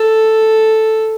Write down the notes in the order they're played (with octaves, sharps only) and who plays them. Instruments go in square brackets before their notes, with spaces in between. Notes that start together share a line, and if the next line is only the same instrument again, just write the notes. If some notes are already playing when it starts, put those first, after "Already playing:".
Already playing: [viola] A4